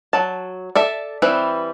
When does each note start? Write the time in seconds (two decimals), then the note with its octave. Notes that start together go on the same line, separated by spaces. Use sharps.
0.13 F#3 A5
0.75 A4 D5 E5
1.22 E3 G3 C4 B4